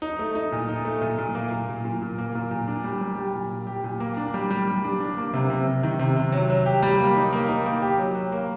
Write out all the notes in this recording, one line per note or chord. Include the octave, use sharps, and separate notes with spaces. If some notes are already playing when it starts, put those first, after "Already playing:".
D#4
A3
D#4
A#2
D#4
A3
A#2
A#2
A#3
A#2
A#2
A#2
A#2
A#3
A#2
A#2
D4
G3
G3
G4
A#2
A#2
G4
A#2
A#3
D4
G3
G3
G3
D4
D4
A#3
C3
C3
C3
D#3
C3
C3
F#3
F#3
G4
G3
A#3
D#4
A#3
D#4
A#3
G4
F#3
F#3
A#3